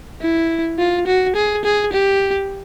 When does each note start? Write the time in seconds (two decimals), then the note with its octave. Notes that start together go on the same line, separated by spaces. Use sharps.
0.21 E4
0.79 F4
1.07 F#4
1.36 G#4
1.65 G#4
1.93 G4